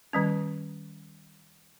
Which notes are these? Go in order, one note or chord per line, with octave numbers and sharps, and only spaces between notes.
D#3 G3 C#4